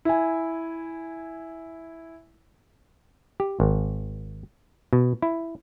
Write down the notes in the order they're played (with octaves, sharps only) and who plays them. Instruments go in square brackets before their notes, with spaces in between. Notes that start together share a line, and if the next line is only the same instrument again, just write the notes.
[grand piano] E4 G#5
[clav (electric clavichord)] G4
G#1
B2
E4